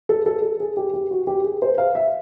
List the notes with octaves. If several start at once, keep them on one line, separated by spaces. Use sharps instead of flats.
A4
A4
A4
G#4
G4
G4
F#4
G4
G#4
C5
F5
E5